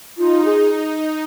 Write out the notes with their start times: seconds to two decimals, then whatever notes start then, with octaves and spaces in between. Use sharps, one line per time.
0.18 D#4 F4
0.45 G#4